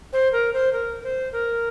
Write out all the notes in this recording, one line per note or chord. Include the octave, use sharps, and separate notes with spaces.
C5
A#4
C5
A#4
C5
A#4